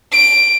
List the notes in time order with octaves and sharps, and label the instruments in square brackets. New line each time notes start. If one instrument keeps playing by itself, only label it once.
[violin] D7